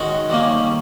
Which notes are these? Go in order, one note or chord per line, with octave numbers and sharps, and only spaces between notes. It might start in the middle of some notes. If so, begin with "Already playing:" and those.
Already playing: D#3 G#3 C#4 F#4
D#3 G3 A#3 C#4